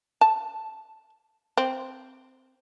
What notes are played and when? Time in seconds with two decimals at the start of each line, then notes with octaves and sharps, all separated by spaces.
0.21 A5
1.57 C4